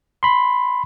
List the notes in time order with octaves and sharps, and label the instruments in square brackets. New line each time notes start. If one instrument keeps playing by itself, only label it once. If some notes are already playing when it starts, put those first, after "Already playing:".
[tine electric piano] B5 C6